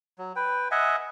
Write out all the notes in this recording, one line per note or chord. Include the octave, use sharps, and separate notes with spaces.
F#3
B4 G5
D#5 E5 F#5 G#5